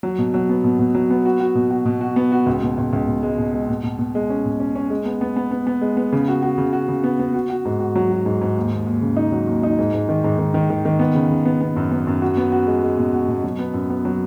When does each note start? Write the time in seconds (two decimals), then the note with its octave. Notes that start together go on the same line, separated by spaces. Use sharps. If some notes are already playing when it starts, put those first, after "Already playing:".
0.03 F#3
0.18 B2
0.34 F#3
0.49 B3
0.64 B2
0.79 B2
0.95 F#3
1.10 B3
1.26 F#4
1.40 F#4
1.55 B2
1.71 F#4
1.85 B2
2.01 F#4
2.16 B3
2.32 F#4
2.46 C#2
2.62 B2
2.78 C#2
2.93 C#2
3.07 B2
3.23 G#3
3.38 B2
3.54 G#3
3.69 B2
3.83 B2
3.99 B2
4.15 G#3
4.30 C#4
4.45 B2
4.60 C#4
4.76 C#4
4.90 G#3
5.06 B3
5.21 B3
5.36 B3
5.51 B3
5.67 B3
5.81 G#3
5.97 B3
6.13 C#3
6.28 F#4
6.42 F#4
6.58 C#3
6.73 F#4
6.88 C#3
7.04 B3
7.19 B3
7.34 F#4
7.50 F#4
7.65 G#2
7.80 F#4
7.95 F#3
8.11 F#4
8.26 G#2
8.41 G#2
8.56 D#2
8.71 D#2
8.87 D#2
9.02 C#3
9.17 D#4
9.32 F#3
9.47 D#2
9.63 D#4
9.79 G#2
9.94 G#2
10.09 D#3
10.24 G#2
10.39 D#3
10.54 D#3
10.70 D#3
10.85 D#3
10.99 B3
11.15 C#3
11.30 C#3
11.45 B3
11.61 B3
11.76 F#2
11.92 B3
12.07 F#2
12.22 F#4
12.37 B3
12.52 F#4
12.67 G#3
12.83 G#3
12.98 B2
13.13 F#4
13.28 B2
13.44 F#3
13.59 B3
13.74 F#2
13.90 B3
14.05 F#3